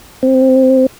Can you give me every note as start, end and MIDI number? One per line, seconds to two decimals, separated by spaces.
0.23 0.86 60